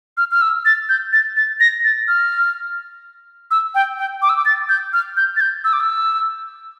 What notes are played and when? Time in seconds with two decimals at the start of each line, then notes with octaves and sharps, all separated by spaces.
0.17 F6
0.31 F6
0.42 E6
0.65 A6
0.89 G6
1.13 A6
1.37 A6
1.60 A#6
1.84 A6
2.08 F6
3.51 E6
3.75 G5
3.98 G5
4.22 D6
4.29 E6
4.37 D6
4.45 A6
4.69 G6
4.93 F6
5.17 G6
5.37 A6
5.41 G6
5.64 E6
5.73 D6
5.80 E6